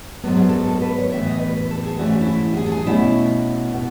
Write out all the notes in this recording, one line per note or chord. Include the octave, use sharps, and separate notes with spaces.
G#2 F#3 B3 A4
G#4
A4
A4
B4
C#5
A2 E3 B3 E5
D#5
B4
B4
A4
G#4
G#2 E3 A3 C#4 F#4
E4
F#4
G#4
A4
G#4
B2 A3 C#4 E4
B2